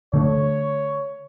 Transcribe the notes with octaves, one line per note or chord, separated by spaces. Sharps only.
D3 A3 C#5